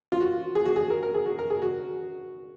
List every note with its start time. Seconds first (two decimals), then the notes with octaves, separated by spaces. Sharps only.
0.12 F4
0.20 F#4
0.55 G#4
0.65 F#4
0.76 G#4
0.90 A#4
1.03 A#4
1.14 G#4
1.26 F#4
1.39 A#4
1.50 G#4
1.62 F#4